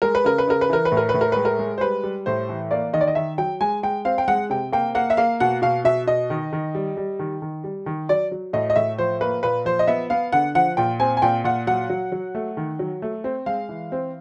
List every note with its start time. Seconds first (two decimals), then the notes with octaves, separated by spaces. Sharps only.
0.02 G#3 A#4
0.15 B4
0.24 C#3 A#4
0.38 B4
0.48 C#3 A#4
0.61 B4
0.69 E3 A#4
0.85 B4
0.92 A2
0.97 A#4
1.09 B4
1.14 A2
1.21 A#4
1.32 G#3 B4
1.45 A#4
1.59 G#3
1.78 C5
1.81 G3 B4
2.04 G3
2.26 A2 C5
2.49 E3
2.71 A#3 D5
2.93 D#3 D#5
3.01 D5
3.08 D#5
3.15 D#3 E5
3.38 F#3 G5
3.61 G#3 G#5
3.83 G#3 G5
4.05 C4 F5
4.18 G5
4.28 G#3 F#5
4.50 C3 G5
4.72 A#3 G5
4.95 A#3 F#5
5.10 E5
5.17 A#3 F5
5.40 B2 F#5
5.62 B2 F5
5.84 B2 E5
6.07 B2 D#5
6.30 D#3
6.53 D#3
6.75 G3
6.97 G3
7.19 D#3
7.42 D#3
7.64 G3
7.86 D#3
8.09 F#3 D5
8.32 F#3
8.53 A2 D#5
8.70 D#5
8.76 A2 E5
8.98 F3 C5
9.21 A#3 B4
9.43 A#2 B4
9.65 F3 C5
9.79 D#5
9.87 B3 E5
10.10 B3 F5
10.33 D3 F#5
10.55 F3 F#5
10.77 A#2 G5
11.00 C4 G#5
11.17 G#5
11.22 A#2 G5
11.44 A#2 F#5
11.67 F#3 F#5
11.89 F#3
12.12 F#3
12.35 A3
12.57 D#3
12.79 F#3
13.02 A3
13.24 C4
13.46 G#3 F5
13.69 E3
13.92 C4